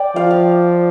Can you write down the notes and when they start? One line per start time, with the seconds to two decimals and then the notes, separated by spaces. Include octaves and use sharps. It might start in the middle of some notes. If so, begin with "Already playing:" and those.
Already playing: D5 G5
0.16 F3 F5
0.31 F5